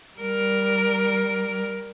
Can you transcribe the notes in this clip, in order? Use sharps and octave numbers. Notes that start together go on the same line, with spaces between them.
G3 A#4